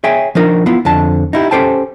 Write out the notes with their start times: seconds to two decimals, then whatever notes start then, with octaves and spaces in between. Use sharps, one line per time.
0.04 G#4 C#5 E5 G5 G#5
0.35 F3 D4 D#4 A#4
0.66 B3 E4 F4
0.85 F2 D3 A5
1.33 D#4 E4 G4
1.51 C#4 G4 A4 C5 G5 A5